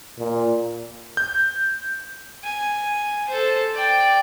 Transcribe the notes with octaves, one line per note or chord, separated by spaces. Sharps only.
A#2
G6
G#5
A4 C5
D5 G5